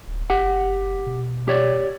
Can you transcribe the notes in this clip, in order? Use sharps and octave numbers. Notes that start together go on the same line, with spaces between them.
D1
F#1 G4 F#5
B2
G4 C#5 D5